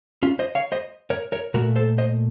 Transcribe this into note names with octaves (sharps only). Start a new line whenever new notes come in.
C#4 F4
C5 D#5
C#5 F5
C5 D#5
A#4 C#5
A#4 C#5
A#2 A3 F#4 A#4
A4 C5
C5 D#5